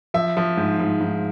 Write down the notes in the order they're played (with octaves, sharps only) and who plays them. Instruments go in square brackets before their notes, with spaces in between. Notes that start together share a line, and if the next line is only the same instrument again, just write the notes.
[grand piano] F3 E5
F3
G#2
G#2
G#2